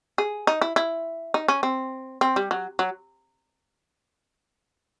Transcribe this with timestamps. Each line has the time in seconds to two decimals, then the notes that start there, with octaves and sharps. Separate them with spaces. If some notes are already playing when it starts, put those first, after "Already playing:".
0.18 G#4
0.47 D#4
0.61 E4
0.76 E4
1.34 D#4
1.48 C#4
1.63 C4
2.21 C4
2.36 G3
2.51 F#3
2.79 F#3